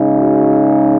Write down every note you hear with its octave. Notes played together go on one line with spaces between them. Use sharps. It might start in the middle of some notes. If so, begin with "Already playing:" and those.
Already playing: C#3 G#3 D#4
F#4